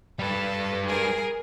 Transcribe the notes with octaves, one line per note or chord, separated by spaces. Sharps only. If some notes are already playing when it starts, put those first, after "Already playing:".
G3 A4 B4
G#4 A#4